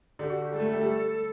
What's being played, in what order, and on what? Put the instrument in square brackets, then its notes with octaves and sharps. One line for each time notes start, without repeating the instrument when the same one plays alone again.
[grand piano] D3 [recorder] G4
[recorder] F#4
G4
[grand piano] G3 [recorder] A4
[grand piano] A3
G3
A3
G3